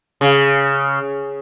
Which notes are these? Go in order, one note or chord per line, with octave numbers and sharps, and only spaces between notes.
C#3